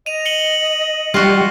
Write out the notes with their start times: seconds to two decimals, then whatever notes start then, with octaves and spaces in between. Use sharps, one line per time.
0.06 D#5 D#7 F7
0.25 C#7 F#7 G7
1.14 G3 F4 F#4 A#6